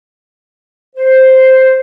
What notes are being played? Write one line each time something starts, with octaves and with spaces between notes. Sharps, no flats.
C5